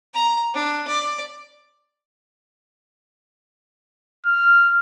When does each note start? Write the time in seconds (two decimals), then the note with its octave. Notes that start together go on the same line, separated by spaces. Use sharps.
0.15 A#5
0.54 D4
0.88 D5
4.26 F6